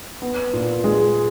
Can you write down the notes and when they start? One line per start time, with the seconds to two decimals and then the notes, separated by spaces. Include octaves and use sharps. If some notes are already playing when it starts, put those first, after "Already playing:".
0.22 B3
0.53 A#2
0.84 G#3